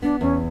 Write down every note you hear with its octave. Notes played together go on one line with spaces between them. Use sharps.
B3 D4
E2 C#4